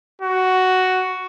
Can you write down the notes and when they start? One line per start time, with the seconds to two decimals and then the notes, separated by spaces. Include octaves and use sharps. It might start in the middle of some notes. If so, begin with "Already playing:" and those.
0.22 F#4